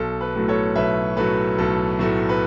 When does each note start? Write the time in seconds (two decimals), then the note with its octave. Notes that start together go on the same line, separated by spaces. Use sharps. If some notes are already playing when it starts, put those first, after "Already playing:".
Already playing: B1 A4
0.21 B4
0.34 A2 F#3 A3
0.48 A4 C#5
0.75 B1 B4 E5
1.17 A2 F#3 A3 B4
1.58 B1 A4
1.99 A2 F#3 A3
2.29 B4